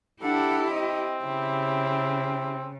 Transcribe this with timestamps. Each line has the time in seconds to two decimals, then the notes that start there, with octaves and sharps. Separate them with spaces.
0.22 D4 E4 G4 A4 F#5
0.69 C4 D#5
1.24 C#3 E4 G4